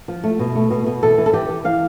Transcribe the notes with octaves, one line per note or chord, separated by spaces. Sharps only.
F3
A3
B2
A3
B2
B2
E3 A4
E3
A4
E3 G4
E3
E3 F5